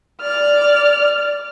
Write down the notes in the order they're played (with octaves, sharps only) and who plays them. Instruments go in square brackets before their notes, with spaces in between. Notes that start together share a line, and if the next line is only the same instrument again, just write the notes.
[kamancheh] D5 F6